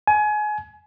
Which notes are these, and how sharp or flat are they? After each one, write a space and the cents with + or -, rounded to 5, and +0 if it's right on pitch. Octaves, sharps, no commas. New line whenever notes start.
G#5 +25